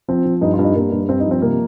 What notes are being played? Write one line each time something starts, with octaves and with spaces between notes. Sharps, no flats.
F3 C4
F3
G2 D#4
F4
G2
D#4
G2 A#3
G2
G2 C4
D#4
F3
C4
C3 A#3